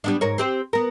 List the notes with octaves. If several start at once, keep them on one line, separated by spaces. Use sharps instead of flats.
G3 B3 D4
G#2 A#4 C#5
C4 G4 C5
B3 A#4